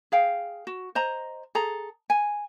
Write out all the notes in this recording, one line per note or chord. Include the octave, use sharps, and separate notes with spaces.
G#4 F5 G5
F#4
C5 D#5 A#5
G#4 A4 A#5
G#5